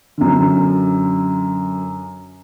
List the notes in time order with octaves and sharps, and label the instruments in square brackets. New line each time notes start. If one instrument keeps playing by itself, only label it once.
[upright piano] F#2 D3